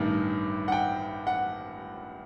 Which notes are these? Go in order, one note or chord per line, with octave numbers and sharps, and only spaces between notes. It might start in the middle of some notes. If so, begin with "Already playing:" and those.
Already playing: A1 G2 D#3
F#5
G5
F#5